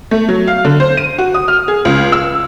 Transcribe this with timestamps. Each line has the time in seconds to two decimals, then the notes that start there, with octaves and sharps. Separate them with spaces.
0.11 A3
0.29 F#3
0.47 F5
0.65 D3
0.80 C5
0.97 D#7
1.18 F#4
1.34 D#6
1.48 F6
1.68 G#4
1.85 C#2
2.12 E6